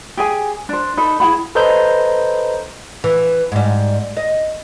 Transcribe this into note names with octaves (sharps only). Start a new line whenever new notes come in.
G4 G#4 G#5
D4 C5
D#4 A4 B4
E4 G#4 F#5 B5
A4 B4 C5 D#5 A#5 G6
E3
G#2 G3
D#5